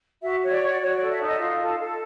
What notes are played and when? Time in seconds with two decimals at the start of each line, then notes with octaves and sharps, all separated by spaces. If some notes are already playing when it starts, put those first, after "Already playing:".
0.22 F#4 E5
0.42 C#5
0.51 D5
0.61 F#4
0.66 D5
0.80 F#4 C#5
0.95 D5
1.01 A4
1.10 E5
1.20 D#4
1.25 D#5
1.39 F4
1.60 A4
1.80 A4